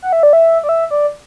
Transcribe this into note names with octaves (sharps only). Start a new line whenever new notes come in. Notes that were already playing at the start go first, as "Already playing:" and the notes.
F#5
E5
D5
E5
D5
E5
D5